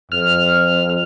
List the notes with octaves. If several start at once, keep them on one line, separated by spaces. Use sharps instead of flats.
F2 F6